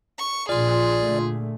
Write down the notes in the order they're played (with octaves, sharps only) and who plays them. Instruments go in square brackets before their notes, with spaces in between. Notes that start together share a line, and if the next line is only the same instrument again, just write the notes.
[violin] C#6
[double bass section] A#1 [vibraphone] F4 C6 [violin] G#4 [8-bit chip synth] D5
[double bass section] A#2 D3 A3